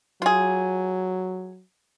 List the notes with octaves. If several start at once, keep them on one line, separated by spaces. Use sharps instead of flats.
F#3 F4 G#4